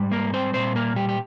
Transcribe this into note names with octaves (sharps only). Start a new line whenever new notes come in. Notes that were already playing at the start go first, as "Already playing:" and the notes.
Already playing: G#2 G3
A#3 A#4
C4 C5
A#2 G3 C4 C5
A#3 A#4
G3 G4
G4